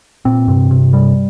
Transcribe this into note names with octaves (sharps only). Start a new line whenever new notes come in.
A#2 C4
G2 C3
C3
G3